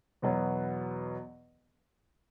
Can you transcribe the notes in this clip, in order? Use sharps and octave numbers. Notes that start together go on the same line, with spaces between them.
E2 B2 F#3 B3